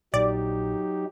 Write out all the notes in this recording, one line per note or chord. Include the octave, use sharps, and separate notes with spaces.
A#1 F#3 D#4 G4 D5